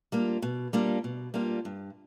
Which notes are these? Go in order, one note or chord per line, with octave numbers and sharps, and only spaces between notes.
G3 A#3 D4 F4
B2
G3 A#3 D4 F4
B2
G3 A#3 D4 F4
G2